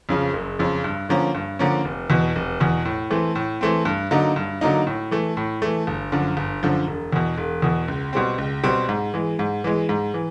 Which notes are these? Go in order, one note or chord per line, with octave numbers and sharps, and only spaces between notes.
F2 C#3 F3
F#1
F2 C#3 F3
G2
D3 F3 A#3 C#4
G2
D3 F3 A#3 C#4
F1
E2 B2
F1
E2 B2
A2
E3 A3 C4
A2
E3 A3 C4
G2
D3 F#3 A#3 D#4
G2
D3 F#3 A#3 D#4
A2
E3 A3
A2
E3 A3
G1
F#2 D3 F3
G1
F#2 D3 F3
E1
E2 B2
E1
E2 B2
C#2
B2 G3 C4
C#2
B2 G3 C4
G#2
E3 G#3
G#2
E3 G#3
G#2
E3